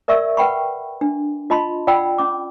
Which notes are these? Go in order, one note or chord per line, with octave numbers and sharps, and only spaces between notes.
A#4 D5 E5 C#6 E6
B4 F#5 G5 B5 C#6
D4
F4 D#5 A5 B5 C6
F4 D5 F#5 G5 B5 E6
C#4 D6